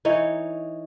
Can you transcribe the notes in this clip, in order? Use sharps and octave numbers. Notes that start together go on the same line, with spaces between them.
E3 D#4 C#5